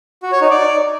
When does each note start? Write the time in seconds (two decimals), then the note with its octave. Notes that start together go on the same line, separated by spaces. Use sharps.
0.23 F#4
0.32 C#5
0.41 D#4
0.51 D5